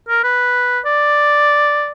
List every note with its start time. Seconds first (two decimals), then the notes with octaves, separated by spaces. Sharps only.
0.09 A#4
0.24 B4
0.85 D5